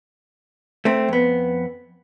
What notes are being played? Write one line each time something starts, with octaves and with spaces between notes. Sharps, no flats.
A3 C4
F2 B3